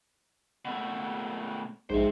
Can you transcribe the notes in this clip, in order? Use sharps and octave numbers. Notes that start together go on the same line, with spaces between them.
B2 A3
A#1 G#2 C5 E5